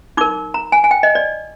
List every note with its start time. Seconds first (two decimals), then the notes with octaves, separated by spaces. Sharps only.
0.17 D#4 A#4 D6
0.54 A#5
0.72 G#5
0.84 G#5
0.91 G5
1.03 D#5
1.15 D5